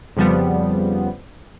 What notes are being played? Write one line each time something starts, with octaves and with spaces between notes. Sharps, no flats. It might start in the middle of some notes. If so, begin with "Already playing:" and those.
F2 C#3 F3 G3 B3